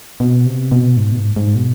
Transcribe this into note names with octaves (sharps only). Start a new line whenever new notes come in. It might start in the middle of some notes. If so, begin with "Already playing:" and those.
B2
C3
B2
G#2
B2
G#2
G#2
B2